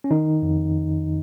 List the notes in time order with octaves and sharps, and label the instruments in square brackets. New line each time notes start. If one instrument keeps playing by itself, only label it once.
[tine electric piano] C#4
D#3 D#4
F2